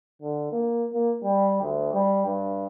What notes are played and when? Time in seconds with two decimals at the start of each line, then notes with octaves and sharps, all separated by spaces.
0.22 D3
0.52 A#3
0.93 A#3
1.23 G3
1.62 D2
1.94 G3
2.26 G2